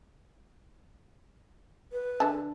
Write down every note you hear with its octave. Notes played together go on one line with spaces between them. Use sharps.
B4
D3 A5